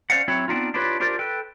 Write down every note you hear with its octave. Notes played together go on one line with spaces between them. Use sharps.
C#4 C5 D5 F5 F#5
F#3 C4 E4 C#5
B3 C4 D4 D#4 F4
D4 E4 F4 G4 B4 C#5
D4 F4 G4 A#4 C5 D5
A4 B4 G5